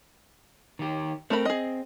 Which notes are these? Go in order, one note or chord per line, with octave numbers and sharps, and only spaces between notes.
D#3 G4
A3 C4 A#4 B5
G#4 D#5